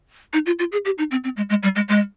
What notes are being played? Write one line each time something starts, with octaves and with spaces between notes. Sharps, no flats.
D#4
F4
F4
G#4
G4
D#4
C4
C4
G#3
G#3
G3
G#3
G#3